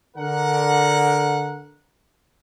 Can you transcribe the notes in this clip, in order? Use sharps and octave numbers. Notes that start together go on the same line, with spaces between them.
D3 A#4 F#5